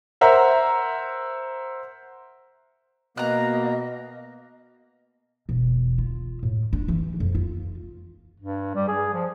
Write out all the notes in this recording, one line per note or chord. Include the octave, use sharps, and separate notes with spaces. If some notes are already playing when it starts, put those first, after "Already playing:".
A#4 C5 E5 F#5 A#5
B2 A#3 D#5 A#5 F#6
E1
F4
A2
D4
E3
F2
F4
G2
G3
G#4
F3